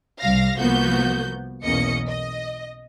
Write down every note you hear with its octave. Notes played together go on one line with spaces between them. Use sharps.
C2 G3 F5 A#6
C2 F3 A#3 B3 F#4 G6
B1 E2 A#3 C#4 D#5 C#7
D#5